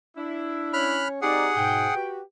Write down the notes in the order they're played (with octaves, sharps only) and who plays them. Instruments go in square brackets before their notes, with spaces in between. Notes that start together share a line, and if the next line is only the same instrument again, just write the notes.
[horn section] D4 E4
[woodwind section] C#4 C#5 [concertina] B5 F6 F#6
[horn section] C4 D5 [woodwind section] D#4 G4 [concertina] G#4 F#5
[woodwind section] G#2 B2 [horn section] G5
[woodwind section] F#4 G4 B4